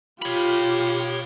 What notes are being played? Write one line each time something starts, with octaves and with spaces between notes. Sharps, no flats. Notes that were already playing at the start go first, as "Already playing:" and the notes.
F4 G4 C#5 B5